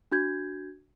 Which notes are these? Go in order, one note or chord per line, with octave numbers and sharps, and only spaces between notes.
D4 F#4 G6 G#6